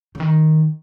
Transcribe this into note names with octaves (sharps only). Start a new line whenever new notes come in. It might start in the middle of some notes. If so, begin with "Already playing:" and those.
C#3
D#3